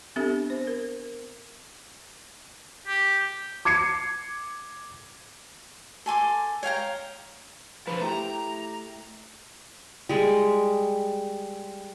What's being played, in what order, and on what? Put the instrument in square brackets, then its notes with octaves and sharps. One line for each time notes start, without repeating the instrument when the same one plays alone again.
[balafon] B3 C4 D4 G4 A4 E5
C5
A#4
[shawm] G4
[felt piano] D6 G#6 C7 C#7
[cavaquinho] A4 G#5 C6 D6
C#5 F5 G5 A#5
[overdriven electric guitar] D3 F3 [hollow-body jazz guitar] B4
[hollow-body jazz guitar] A3 E4 G4 [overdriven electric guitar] A#5
[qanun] G3 G#3